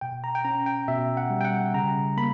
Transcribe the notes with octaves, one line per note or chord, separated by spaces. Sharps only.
B2 G5
A#5
G5
C#4 A#5
G5
B2 E5
F#5
G3
G5
F#5
C#3 A#5
A#3 B5